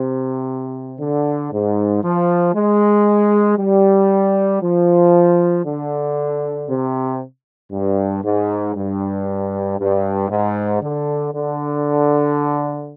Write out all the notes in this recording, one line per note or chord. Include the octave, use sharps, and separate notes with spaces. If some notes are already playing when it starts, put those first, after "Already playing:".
Already playing: C3
D3
G#2
F3
G#3
G3
F3
D3
C3
G2
G#2
G2
G2
G#2
D3
D3